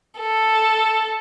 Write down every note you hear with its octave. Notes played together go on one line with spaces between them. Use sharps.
A4